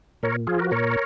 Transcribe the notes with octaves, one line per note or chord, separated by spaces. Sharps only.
A#2 A#4 C#5
F3 F4 G#4
F#4 A#4
A#2 A#4 C#5